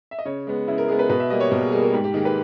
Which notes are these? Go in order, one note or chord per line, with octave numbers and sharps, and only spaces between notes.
E5
D#5
C#3 C#5
G#3 B3
C#3 E4
A#4
G#3 B3 G#4
B4
B2 B4
E5
G3 A#3 D#5
C#5
B2 A#4
G#4
G3 A#3 G#4
A#4
G#2 G4
G4
D#3 A#3 G#4
B4